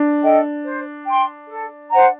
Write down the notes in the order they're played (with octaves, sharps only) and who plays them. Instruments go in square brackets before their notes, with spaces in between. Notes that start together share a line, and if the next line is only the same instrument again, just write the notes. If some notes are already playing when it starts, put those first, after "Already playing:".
Already playing: [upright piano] D4
[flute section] A4 D#5 G5
C5
G5 C6
A4
C5 F#5 A#5